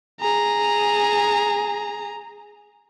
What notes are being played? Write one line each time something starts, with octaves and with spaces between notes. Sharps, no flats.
G#4 A#5